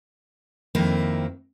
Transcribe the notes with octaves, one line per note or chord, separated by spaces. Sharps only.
F2 D#3 A#3 C4 E4